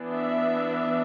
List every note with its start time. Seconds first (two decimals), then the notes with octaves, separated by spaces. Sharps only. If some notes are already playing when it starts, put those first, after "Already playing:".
Already playing: E3 B3 D4
0.15 E5